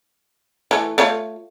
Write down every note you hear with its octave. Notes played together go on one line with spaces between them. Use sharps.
E3 A3
A3 F4 C#5